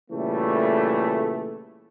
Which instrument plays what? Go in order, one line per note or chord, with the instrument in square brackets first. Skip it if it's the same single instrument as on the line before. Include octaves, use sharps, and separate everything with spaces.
[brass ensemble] A#2 C#3 E3 G3 A3